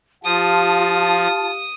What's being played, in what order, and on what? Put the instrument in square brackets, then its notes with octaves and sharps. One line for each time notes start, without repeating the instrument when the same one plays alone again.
[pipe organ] F3 [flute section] F4 A5 [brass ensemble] G4 F5 [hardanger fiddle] D#6